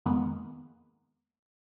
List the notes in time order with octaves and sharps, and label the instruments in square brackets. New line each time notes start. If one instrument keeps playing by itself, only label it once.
[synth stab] F2 D#3 G#3 A#3 B3